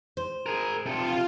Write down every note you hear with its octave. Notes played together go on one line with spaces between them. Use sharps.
C5
G#4 A#4
C3 F4 A4